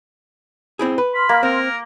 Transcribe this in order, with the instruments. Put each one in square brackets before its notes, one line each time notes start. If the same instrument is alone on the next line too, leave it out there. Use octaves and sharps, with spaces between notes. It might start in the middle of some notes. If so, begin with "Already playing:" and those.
[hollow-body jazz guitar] C4 E4 G#4
B4
[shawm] B5 [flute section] C6 F6
[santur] A#3
[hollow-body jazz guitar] C4 [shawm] A#4